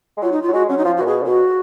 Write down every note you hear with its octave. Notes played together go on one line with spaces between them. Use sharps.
G#3
F#3 F4
D#4
F4
F#3
G#3 F#4
F#3 C#4
D#4
F3 F4
F#4
A#2
B2 G#4
C#3
B2 F#4